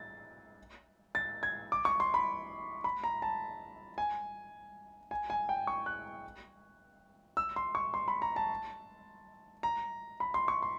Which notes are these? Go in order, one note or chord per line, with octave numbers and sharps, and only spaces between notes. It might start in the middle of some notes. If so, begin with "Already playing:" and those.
Already playing: A6
A6
G#6
D6
C#6
C6
B5
B5
A#5
A5
G#5
G#5
G#5
G5
C#6
F#6
E6
C6
C#6
C6
B5
A#5
A5
A#5
B5
C6
C#6
C6